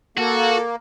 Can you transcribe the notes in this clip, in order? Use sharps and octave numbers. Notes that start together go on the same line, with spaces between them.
A#3 F#4 A4